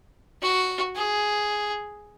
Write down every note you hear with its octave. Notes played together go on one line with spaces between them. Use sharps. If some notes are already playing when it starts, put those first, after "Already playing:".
F#4
G#4